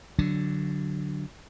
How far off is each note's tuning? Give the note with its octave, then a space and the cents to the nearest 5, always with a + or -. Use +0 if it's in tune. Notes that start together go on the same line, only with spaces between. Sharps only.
D3 +0 F#3 +0 D4 +0